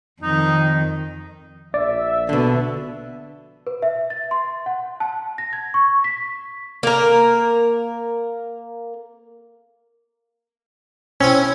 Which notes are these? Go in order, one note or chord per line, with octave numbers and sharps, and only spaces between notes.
F2 D#3 D#4
A#1 D5 E5
B2 D3
B4
E5
A6
C6
F#5
A5
A#6
G#6
C#6
B6
A#3 A#4
C4 C#4 E4 G#5